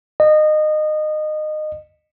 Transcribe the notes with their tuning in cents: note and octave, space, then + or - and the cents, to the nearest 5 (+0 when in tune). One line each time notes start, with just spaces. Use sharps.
D#5 -25